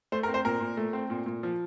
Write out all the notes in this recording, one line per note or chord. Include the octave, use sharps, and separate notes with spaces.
A3 C5
A#4
C4
C5
A#2 A#4
A#2
A3
C4
A#2
A#2
F3